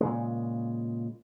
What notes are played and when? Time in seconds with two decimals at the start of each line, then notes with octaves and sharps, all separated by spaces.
0.01 A#2 C#3 G#3